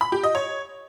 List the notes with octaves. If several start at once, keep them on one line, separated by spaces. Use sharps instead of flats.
B5
G4
D#5
C#5